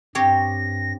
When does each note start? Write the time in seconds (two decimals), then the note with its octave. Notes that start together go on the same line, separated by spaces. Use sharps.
0.15 G2 C4 G4 C#5 A#6